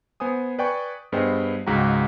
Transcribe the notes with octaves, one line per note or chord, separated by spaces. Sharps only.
B3 C5 G#5 D#6
B4 D5 G5 G#5 C#6
G2 B3 G#4 C5 D#5 G5
C#2 G#2 F#4 G5 A#5